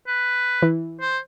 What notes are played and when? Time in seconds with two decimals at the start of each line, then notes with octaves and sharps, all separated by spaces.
0.08 B4
0.62 E3
1.01 C5